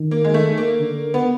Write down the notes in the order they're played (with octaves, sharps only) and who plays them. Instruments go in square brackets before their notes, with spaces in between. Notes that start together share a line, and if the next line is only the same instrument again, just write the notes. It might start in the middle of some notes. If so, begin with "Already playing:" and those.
Already playing: [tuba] D#3
[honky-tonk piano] A#3
G#3
A3
A#3
[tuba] D3
[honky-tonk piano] B3